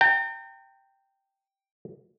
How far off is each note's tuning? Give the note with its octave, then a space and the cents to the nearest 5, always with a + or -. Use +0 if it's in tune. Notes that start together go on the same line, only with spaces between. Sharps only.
G5 +0 A#5 -40